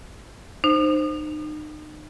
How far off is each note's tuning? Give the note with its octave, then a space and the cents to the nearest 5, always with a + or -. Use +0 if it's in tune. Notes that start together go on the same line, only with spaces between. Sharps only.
D#4 -35 C5 +0